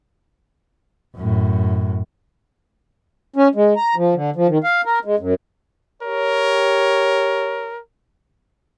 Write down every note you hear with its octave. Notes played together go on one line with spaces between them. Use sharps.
F#2 A2
C#4
G#3
A#5
F3
D3
F3
D#3
F5
A#4
G#3
F#2
G4 A#4 C#5